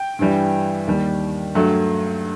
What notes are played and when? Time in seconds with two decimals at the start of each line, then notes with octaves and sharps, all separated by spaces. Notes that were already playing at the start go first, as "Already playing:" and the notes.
Already playing: G5
0.19 G2 E3 G3
0.87 D#2 D#3 G3
1.55 G2 F#3 A3